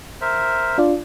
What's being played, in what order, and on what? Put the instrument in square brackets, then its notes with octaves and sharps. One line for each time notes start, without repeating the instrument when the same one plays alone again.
[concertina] A#4 C5 E5
[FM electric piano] D4 F4 D5